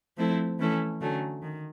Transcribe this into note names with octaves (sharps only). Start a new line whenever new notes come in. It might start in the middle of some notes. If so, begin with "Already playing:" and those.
F3 A3 C4 E4 A4
E3 A3 C#4 E4 A4
D3 F#3 A3 C#4
D#3